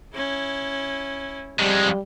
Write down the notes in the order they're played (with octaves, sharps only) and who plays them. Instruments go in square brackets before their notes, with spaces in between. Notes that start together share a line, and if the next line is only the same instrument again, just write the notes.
[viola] C#4 E4
[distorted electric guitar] F2 G#3 [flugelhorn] G3